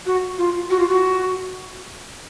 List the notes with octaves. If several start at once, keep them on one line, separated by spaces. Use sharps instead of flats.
F#4
F4
F#4
F4
F#4